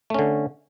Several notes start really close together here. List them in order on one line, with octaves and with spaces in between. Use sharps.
A3 C#4 D3